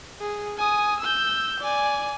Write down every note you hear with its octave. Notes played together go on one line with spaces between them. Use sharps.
G#4
G#5 D#6
E6 G6
D5 G#5